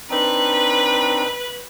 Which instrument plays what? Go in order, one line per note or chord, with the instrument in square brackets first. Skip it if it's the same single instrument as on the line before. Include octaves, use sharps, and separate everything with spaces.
[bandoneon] C4 D4 D#4 [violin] B4